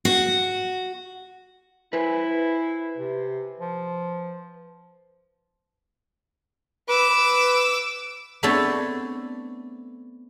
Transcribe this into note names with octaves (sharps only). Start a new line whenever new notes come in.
F#4
E4 B4 C5 G#5
C3
F3
B4 D6 E6
A3 B3 C4 D4 A4 C#5